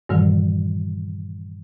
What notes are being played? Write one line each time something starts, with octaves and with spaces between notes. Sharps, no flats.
G2 A#2 D#3 E3 G3